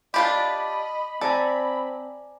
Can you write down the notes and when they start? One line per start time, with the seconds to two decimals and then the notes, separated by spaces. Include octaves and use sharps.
0.14 D4 F4 G4 D#5 B5
1.21 C4 A4 D5 G#5 A#5